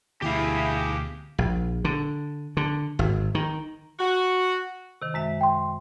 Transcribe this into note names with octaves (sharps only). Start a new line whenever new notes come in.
D2 B2 E3 E4 G4 G#4 F5
A#1
D3
D3
G#1
D#3
F#4
C3 D#3
F#2 G#3 E5
G5 C6